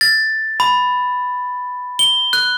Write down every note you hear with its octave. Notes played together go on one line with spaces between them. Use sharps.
A6
B5
G7
F#6